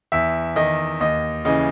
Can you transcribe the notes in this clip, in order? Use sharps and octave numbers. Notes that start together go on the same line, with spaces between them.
E2 E5
D#3 D#5
D#2 D#5
C#3 E3 D#5